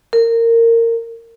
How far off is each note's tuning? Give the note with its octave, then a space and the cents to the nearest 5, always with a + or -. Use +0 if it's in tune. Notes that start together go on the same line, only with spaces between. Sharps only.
A#4 -20